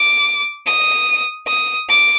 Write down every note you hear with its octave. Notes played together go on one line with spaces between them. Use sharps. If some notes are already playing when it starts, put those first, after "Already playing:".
Already playing: D6
D#6
D#6
D6